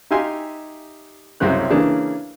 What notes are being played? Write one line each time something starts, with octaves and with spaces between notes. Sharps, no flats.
D#4 G4 E5 F5 G#5 C6
C2 F#2 C#3 C4 F#6
C#3 E3 A#3 D4 G#4